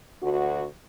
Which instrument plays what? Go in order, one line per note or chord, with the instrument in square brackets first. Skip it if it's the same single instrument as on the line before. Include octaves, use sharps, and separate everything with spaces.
[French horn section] D2 F#4